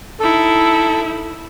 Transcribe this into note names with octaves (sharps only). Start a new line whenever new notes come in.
D#4 E4 A4